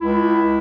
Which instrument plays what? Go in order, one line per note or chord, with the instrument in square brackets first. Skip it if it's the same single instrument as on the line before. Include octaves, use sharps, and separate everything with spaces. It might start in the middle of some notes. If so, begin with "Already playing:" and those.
[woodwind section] C#2 E4